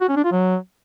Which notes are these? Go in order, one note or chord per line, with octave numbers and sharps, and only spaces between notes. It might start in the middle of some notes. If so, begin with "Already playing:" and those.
F#4
C#4
D4
F4
F#3